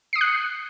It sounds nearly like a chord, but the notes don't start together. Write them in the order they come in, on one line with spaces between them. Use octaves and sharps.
C7 D#6 C#7 F#6